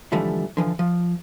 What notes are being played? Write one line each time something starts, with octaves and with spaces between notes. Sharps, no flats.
G#2 D3 E3 F3 G3 A3
D3 E3 F3
F3